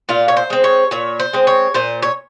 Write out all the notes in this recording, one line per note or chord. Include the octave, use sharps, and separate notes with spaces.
A#2 F4
C#5
C5
G#3 C4
C#5
A#2 C#5
C5
G#3 C4
C#5
A#2 C5
C#5